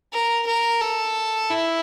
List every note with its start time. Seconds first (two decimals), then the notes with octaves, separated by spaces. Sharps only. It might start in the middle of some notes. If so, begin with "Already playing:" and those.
0.13 A#4
0.46 A#4
0.81 A4
1.50 E4